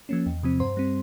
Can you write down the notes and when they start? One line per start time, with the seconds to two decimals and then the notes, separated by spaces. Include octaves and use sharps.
0.09 F3 A#3 C#4
0.26 E2
0.43 C3 F3 C4
0.60 G2 C5 C6
0.77 G3 C4